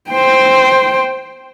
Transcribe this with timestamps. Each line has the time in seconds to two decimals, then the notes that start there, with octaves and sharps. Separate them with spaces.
0.11 C5 G5